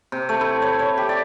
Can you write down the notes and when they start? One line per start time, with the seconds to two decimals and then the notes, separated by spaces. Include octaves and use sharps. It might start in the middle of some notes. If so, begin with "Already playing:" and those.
0.12 C3
0.29 A3
0.41 E4
0.62 C#5
0.79 C#5
0.97 G4
1.09 D5